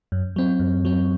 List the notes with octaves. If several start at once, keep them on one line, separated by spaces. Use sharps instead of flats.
F#2
F#3 C4
F#2
F#3 C4